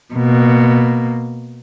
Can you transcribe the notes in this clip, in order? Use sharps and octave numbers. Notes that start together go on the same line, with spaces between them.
B2 A#3